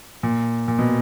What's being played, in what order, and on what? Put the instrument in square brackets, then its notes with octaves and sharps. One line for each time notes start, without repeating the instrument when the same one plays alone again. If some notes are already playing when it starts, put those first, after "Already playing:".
[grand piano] A#2
A#2
B2